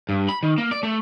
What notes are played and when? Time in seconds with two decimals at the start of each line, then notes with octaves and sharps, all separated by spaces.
0.09 G2
0.29 B5
0.43 D#3
0.58 A#3
0.71 D5
0.83 A3